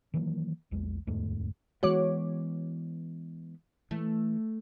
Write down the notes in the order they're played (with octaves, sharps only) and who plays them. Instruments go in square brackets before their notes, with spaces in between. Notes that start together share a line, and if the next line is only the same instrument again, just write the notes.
[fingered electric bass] D#3 E3 F#3 A#3
A#1 E2 G#3
D1 E2 G#2 A3
[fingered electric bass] E3 G#3 B3 [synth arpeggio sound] F#4 C#5 D6
[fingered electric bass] E3 [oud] A3